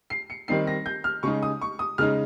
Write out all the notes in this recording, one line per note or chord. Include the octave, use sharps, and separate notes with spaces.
C7
C#7
D#3 G3 C4 D#4 C7
A#6
G6
F6
C#3 G#3 D#4 C#6
D#6
C#6
D#6
C#3 G#3 D#4 F6